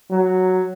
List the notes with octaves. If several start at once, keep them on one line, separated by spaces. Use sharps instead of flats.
F#3